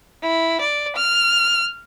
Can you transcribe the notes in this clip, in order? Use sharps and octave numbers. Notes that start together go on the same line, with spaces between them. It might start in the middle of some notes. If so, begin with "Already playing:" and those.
E4
D5
F6